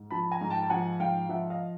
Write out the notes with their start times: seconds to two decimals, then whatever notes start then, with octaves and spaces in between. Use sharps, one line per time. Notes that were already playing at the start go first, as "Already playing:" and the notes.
Already playing: G#2
0.11 F3 A5 B5
0.31 G#5 A#5
0.41 G#2
0.50 G5 A5
0.63 A5
0.70 F3 F#5 G#5
1.00 G#2 F5 G5
1.29 F3 E5 F#5
1.50 D#5 F5